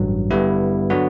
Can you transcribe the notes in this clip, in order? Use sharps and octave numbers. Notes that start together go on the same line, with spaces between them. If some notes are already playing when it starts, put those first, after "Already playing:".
Already playing: A1 G2 F#3
G2 D3 G3 B3 E4
D3 F#3 B3 F#4